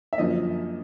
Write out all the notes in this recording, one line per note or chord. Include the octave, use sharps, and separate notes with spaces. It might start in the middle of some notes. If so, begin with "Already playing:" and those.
E5
F#2 D3 F3 A#3 D#5